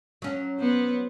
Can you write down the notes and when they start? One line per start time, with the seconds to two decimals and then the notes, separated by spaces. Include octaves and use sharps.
0.22 F#3 C#4
0.58 B3 C5